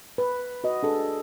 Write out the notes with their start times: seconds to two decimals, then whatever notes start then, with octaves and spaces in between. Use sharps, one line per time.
0.18 B4
0.64 F#4 B4 D#5
0.83 D4 G#4 A4